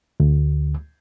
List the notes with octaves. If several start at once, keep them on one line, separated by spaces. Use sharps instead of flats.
D2